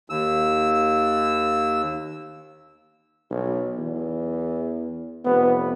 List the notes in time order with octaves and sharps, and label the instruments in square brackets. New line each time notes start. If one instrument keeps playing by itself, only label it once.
[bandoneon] D#2 E6
[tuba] B1
E2
[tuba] F1 [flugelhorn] B3